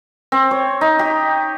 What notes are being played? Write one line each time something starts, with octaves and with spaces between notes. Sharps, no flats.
C4
C#5
D#4
G4